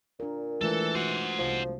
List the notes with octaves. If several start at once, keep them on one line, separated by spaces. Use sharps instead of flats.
A#2 D4 A#4
E3 G#3 A3 F4 A4
F4 F#4 C5 F#5
C2 F3